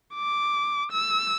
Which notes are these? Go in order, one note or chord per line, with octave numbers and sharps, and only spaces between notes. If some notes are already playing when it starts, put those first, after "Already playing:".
D6
E6